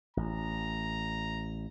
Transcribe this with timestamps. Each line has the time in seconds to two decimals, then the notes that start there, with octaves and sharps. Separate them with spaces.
0.17 A1 A#5